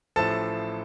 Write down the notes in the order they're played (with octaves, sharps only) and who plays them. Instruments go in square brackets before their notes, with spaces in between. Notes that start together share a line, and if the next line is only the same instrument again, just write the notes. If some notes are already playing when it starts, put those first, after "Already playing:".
[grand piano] A1 A2 F3 A4 A5